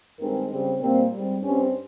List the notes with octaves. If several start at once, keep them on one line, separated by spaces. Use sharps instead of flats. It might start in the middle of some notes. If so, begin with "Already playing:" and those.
G2 D#3 G#3 C4 A#4
C#3 G3 C4
A#2 G3 A#3 C4
G#2 G3 C4
G2 G3 C4 C#4